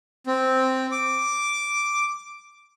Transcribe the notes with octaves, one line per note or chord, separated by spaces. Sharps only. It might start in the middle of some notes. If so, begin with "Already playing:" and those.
C4
D6